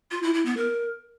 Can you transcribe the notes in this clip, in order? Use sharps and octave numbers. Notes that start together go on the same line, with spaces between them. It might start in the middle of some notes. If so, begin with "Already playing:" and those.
F4
E4
E4
B3
A#4